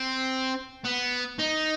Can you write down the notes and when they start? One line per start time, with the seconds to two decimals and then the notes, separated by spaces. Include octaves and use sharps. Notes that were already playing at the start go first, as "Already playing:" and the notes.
Already playing: C4
0.84 B3
1.39 D#4